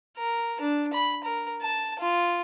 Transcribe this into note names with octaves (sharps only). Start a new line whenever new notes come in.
A#4
D4
B5
A#4
A5
F4